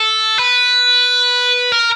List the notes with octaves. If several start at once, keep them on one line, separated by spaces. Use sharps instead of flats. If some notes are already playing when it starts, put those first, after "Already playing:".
Already playing: A4
B4
A#4